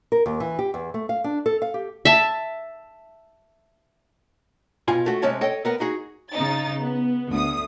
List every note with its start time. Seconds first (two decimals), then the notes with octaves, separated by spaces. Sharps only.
0.12 A#4
0.26 D#2
0.40 E3
0.59 G4
0.74 E2
0.94 A3
1.09 F5
1.24 D4
1.46 A4
1.62 F5
1.74 G4
2.05 E5 A5
4.88 B2 F4 G#5
5.06 A3 F#4
5.22 C3 G#3 C#4 C#5 A5
5.41 A4 C#5 D#5 G5
5.65 B3 A#4 F#5
5.80 D#4 F#4 G#4
6.31 C#3 D#4 A6
6.81 B3
7.30 D2 D#6